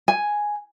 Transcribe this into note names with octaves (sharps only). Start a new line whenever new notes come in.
G#5